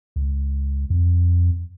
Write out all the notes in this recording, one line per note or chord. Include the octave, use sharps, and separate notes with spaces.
C#2
F2